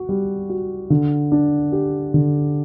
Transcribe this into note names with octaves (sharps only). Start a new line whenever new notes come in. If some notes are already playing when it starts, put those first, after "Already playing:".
Already playing: F#4
G3
F#4
D3
D4
G4
D3